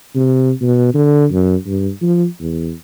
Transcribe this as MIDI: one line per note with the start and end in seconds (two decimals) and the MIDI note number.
0.15 0.52 48
0.61 0.93 47
0.94 1.26 50
1.31 1.56 42
1.66 1.90 43
2.01 2.26 53
2.40 2.71 40